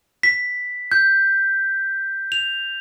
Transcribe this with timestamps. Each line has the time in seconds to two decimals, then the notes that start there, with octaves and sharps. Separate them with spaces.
0.23 B6
0.92 G6
2.32 F7